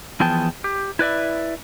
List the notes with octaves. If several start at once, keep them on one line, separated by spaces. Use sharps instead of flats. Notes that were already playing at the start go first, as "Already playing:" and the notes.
E3 F3 B3 G#4 G5 A5
G4
E4 B4 D5 E5